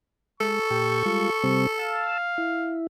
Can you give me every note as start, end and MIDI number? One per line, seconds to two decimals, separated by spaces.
0.40 0.59 56
0.40 2.16 69
0.40 1.72 85
0.70 1.03 46
0.70 1.03 67
1.06 1.30 55
1.06 1.30 56
1.06 1.30 65
1.44 1.67 48
1.44 1.67 55
1.44 1.67 60
1.79 2.79 77
1.79 2.18 81
1.79 2.18 88
2.38 2.87 64